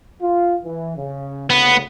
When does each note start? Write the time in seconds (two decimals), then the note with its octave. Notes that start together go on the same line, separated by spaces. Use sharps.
0.22 F4
0.65 E3
0.97 C#3
1.50 D2 C#3 B3